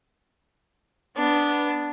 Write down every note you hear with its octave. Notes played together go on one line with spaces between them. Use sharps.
B3 D4